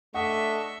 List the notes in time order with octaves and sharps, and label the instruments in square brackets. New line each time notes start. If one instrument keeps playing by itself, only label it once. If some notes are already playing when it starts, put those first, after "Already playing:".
[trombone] A3 [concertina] D4 D#5 C#6 [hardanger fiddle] E5 [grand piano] F#5